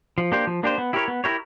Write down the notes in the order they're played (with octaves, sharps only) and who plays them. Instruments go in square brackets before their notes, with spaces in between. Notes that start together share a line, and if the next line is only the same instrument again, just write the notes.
[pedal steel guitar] F3
A#3 D4 G4 C5
F3
A#3 D4 G4 C5
B3
E4 G4 A#4 C#5
B3
E4 G4 A#4 C#5